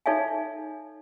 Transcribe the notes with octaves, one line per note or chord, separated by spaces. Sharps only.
D#4 A4 C#5 E5 F5 G#5